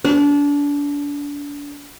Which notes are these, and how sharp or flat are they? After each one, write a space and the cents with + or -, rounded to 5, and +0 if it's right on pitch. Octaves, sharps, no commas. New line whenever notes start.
D4 -30